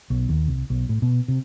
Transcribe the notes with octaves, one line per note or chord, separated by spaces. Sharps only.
B1
D#2
C2
B1
A2
B2
C3